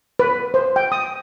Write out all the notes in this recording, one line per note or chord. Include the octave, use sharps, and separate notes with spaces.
B4
C5
G5
D#6